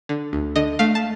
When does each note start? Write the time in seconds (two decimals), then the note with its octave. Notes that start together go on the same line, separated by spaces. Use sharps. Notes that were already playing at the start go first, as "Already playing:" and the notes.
0.09 D3
0.33 D2
0.56 D3 D#5
0.79 A3 F5
0.95 A5